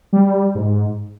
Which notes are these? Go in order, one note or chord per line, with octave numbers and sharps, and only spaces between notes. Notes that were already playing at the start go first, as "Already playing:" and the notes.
G3
G#2